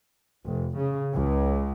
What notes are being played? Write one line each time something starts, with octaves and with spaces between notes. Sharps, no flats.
F1
C#3
C#2